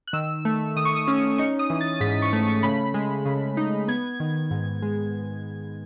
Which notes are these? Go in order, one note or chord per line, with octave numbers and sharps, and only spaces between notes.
F#6
D#3 E6
A3
D#3 D#6
C#6
D#6
C#4
D#4 C#6
D#6
E3
A6
G#2 B6
C#6
A3
C#6
C#3 B5
G#3
C#3
D#4
B3 G#6
D#3
G#2
G#3